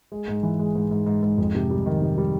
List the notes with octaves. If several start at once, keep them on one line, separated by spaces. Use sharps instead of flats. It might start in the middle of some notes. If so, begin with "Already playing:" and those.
G#3
G#2
E3
G#3
G#2
G#2
G#2
G#2
F2
C3
G3
D#3
C3
G3